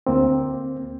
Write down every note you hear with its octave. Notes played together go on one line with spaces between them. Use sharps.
D2 A#3 C4